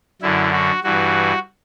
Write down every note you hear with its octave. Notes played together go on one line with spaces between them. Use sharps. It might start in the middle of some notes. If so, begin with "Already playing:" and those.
F#2 D3 E4
F#4
G2 E3 F#4